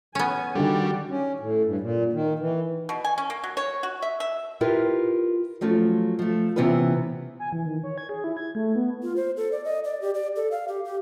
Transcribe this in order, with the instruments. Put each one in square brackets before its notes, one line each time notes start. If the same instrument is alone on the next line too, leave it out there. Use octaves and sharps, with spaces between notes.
[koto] B3 C#4 [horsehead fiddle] G#5
[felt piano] D3 D#3 [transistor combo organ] G3 [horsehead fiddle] D4 F#4
[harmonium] C#4
A2
G2
A#2
D#3
E3
[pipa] B2
G#5
C#4
A#3
F#3
C#5
F#4
E5
E5
[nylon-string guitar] E4 F4 G4 A#4 B4
F3 F#3 A3 C#4 F4
F3 A3
C3 E3 B3 C#4 F4 B4
[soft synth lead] G#5
E3
D#3
C#5
G#6
G#4
E4
G#6
A3
B3
[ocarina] F4
C5
A4
D5
D#5
D5
G4
D5
A4
F5
G4
G4